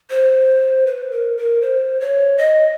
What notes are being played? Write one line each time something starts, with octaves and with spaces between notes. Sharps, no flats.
C5
B4
A#4
A#4
C5
C#5
D#5